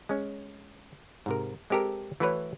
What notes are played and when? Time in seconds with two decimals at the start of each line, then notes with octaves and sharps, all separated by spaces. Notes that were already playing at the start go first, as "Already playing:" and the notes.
0.09 G#3 C#4
1.26 G#2 C3 A#4
1.70 G#3 C4 G4 A4 A#4
2.20 E3 A3 E4 F#4 B4 C#5